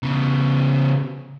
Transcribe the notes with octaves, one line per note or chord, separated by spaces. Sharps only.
C#3 B3